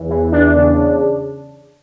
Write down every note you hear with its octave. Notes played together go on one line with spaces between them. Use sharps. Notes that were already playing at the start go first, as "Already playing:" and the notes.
Already playing: E2
E3
E2 D4
C#3